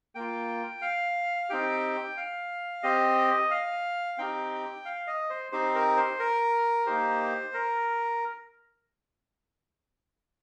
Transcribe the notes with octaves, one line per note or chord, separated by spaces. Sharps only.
A#3 F4 G5
F5
C4 D#4 G4 G5
F5
C4 G4 D#5
F5
C4 D#4 G4 G5
F5
D#5
C5
C4 D#4 G4 C5
A#4
C5
A#4
A#3 D#4 G4 C5
A#4